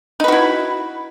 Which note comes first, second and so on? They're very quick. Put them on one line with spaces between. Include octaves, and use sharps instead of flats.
D#4 B4 F#4 E4